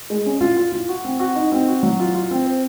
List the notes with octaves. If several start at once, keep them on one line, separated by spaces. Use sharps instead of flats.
G#3
C#4
F4
F4
F4
F#4
C4
F#4
D#4
C4
F#4
F#3
F4
F4
C4
C5